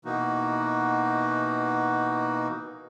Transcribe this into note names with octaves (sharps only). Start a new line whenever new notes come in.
B2 E3 A#3 D#4 F#4